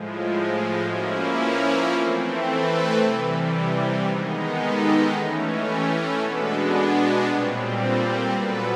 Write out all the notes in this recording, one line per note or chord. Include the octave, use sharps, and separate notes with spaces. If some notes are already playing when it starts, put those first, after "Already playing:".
Already playing: A2 F3 G#3
F3 A#3 C#4 E4 F#4 G#4
B4 C#5
E3 A3 C4
A4 B4
C3 E3 G3
D#3 G#3 B3 D#4 G#4 A#4
G4 A4
E3 A3 C#4
G4
B2 G#3 B3 D4 A4 B4
A#2 G3 C4 B4 C#5
A4 B4
A#2 F#3 B3 A4 B4